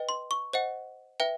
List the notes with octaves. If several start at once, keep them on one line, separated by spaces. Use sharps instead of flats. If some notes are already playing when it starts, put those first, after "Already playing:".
Already playing: B4 D#5 G5
C6
C#6
C5 D#5 F#5
B4 E5 G5